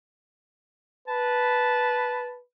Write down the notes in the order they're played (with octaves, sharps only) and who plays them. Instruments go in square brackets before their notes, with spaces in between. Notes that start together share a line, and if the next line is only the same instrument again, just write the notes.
[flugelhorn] B4 [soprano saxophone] A5